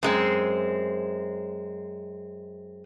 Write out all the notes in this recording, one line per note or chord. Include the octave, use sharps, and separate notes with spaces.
F#2 G#3 C4